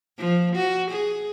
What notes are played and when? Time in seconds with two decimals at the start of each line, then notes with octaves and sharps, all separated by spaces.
0.19 F3
0.55 F#4
0.91 G#4